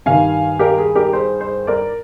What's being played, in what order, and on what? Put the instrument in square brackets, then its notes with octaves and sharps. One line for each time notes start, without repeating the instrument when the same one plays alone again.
[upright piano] G2 D#3 G3 F5 G#5
G4 A#4
G#4
G4 A#4
G#4 C5
G#4 C5
A#4 D5